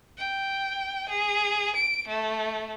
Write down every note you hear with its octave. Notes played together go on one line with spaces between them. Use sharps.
G5
G#4
D7
A3